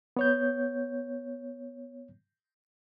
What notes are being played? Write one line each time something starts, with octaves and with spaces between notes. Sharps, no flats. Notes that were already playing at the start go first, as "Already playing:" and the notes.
B3 C#5 G6